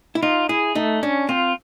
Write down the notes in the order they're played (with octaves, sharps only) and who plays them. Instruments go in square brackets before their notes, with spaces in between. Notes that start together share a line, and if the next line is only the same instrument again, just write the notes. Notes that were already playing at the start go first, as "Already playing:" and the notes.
[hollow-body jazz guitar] E4
[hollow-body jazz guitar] D#4 [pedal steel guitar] F4
[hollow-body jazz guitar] E4 [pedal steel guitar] G#4
[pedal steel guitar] A3 [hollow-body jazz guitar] D#4
[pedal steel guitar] C#4 [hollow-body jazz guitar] D4
[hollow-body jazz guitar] C4 [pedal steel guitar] F4